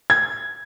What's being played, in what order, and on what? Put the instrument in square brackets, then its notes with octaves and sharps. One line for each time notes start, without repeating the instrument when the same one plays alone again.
[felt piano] G#6